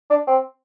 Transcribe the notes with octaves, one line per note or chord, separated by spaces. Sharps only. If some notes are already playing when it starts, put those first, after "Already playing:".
D4
C4